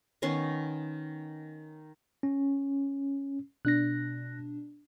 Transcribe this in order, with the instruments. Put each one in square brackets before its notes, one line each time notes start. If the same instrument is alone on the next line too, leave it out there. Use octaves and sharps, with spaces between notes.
[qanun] D#3 B3 C#4 C6
[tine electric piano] C#4
[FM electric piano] B2 D4 [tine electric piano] F#6 A#6